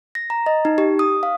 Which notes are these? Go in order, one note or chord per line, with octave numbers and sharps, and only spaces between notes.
A#6
A#5
D#5
D#4
G4
D#6
F5